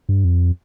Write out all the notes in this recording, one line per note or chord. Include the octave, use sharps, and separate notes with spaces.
G2
F2